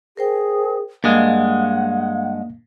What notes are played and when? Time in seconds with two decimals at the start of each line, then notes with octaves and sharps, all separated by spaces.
0.17 G#4 A#4 C5 G5
1.04 G2 G#3 A#3 F5 F#5